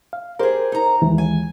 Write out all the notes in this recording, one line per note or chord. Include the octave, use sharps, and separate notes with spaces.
F5
G4 G#4 A#4 C5
D#4 A#5
D#2 E3 G#3
G#5